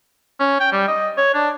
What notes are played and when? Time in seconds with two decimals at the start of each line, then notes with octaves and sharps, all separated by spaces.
0.40 C#4
0.60 G5
0.72 G3
0.88 D#5
1.18 C#5
1.34 D4